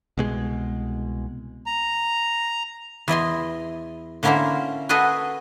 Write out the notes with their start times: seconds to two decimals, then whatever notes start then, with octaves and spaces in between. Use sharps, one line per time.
0.18 C2 B2 G#3
1.66 A#5
3.08 E2 E4 D#5 C6
4.23 D3 A#3 C#4 E4 A#4 C5
4.89 F#4 G#4 A4 B4 D#5 G#5